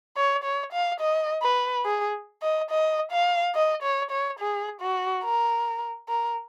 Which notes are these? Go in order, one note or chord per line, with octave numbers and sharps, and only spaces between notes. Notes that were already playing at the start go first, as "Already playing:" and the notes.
C#5
C#5
F5
D#5
B4
G#4
D#5
D#5
F5
D#5
C#5
C#5
G#4
F#4
A#4
A#4